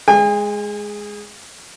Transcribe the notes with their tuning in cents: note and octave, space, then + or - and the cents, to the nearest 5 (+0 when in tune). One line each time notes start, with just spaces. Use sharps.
G#3 +0 G#5 -40